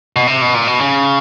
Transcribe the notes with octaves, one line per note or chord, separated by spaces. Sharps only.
B2
C3
B2
A#2
B2
C#3